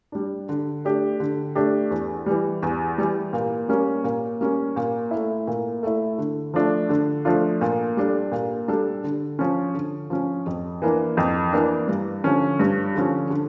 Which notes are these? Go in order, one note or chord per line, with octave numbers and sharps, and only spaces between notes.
G3 D4
D3
A3 D4 G4
D3
A3 D4 G4
E2
E3 G3
E2
E3 G3
A#2
G3 A#3 C#4
A#2
G3 A#3 C#4
A#2
A3 E4
A#2
A3 E4
D3
F3 A3 D4 F4
D3
F3 A3 D4 F4
A#2
G3 D4 A4
A#2
G3 D4 A4
D3
F3 C#4
D3
F3 C#4
F2
E3 A#3 D4
F2
E3 A#3 D4
G2
D3 F3 C#4
G2
D3 F3 C#4
D3